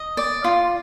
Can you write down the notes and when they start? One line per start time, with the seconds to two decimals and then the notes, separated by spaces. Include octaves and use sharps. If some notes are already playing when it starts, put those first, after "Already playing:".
Already playing: D#5
0.17 D5
0.44 F4